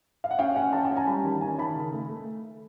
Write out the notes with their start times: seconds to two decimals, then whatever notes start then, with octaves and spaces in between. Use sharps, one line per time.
0.24 F5
0.31 F#5
0.39 C#4 F5 G5
0.56 C#4 F#5 G#5
0.73 C#4 G5 A5
0.85 G5 A5
0.91 C#4
0.96 G#5 A#5
1.07 G3 A5 B5
1.24 D#3
1.41 C#4 G#5 A#5
1.58 D#3 A5 B5
1.75 C#3
1.92 A3
2.09 A3